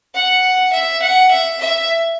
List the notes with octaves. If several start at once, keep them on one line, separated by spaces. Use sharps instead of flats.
F#5
E5
F#5
E5
E5